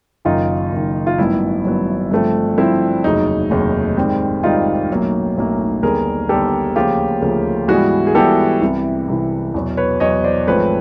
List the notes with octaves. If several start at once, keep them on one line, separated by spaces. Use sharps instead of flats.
F#1 F#2 D#3 D#4 F4
F#1 F#2 D#3
F4
A1 G2 D#3 F#3 B3 E4
A1 G2 D#3 F#3 B3
G2 D3 F3 A3 C4
G2 D3 F3 A3 C4 E4
F1 D#2 C#3 F#3 D#4
F1 D#2 C#3 F#3
G#2 D#3 G3 C4
G#2 D#3 G3 C4 D#4 F4
B1 A2 F#3 A#3 C#4
B1 A2 F#3 A#3 C#4
D#2 D3 G3 B3 G#4 A#4
D#2 D3 G3 B3 G4 A4
D2 C#3 F3 A#3 C#4 F4 G4
D2 C#3 F3 A#3 C#4
G#2 E3 G3 B3 F#4 G#4
G#4
G#2 E3 G3 B3 G4 A4
C2 C3 E3
C2 C3 E3
E2 B2 F#3
B4 C#5
E2 B2 F#3 C#5 D#5
C5 D5
G#1 G#2 F3 A3 C4 B4 C#5